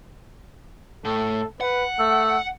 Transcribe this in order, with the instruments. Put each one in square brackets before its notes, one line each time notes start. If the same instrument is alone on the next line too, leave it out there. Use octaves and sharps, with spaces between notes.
[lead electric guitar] A2 [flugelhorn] A4
[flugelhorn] B4 [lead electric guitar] F#5
[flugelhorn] A3 [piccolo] E6